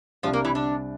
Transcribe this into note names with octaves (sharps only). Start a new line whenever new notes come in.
C2 C3 F3 G3 D4 F4
A#3 A#4
E3 E4
D3 D4